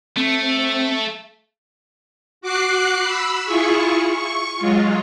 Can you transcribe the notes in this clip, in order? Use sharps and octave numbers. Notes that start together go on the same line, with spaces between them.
A3 C4
F#4 D6 F#6 C7
B5 E6
E4 F4 G#4 C#6
C#6
F#3 G#3 F4